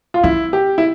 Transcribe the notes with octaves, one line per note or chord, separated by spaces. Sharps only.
F4
C4 E4
G4
E4